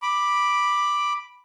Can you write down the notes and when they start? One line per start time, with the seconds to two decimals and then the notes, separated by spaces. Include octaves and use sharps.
0.02 B5 D6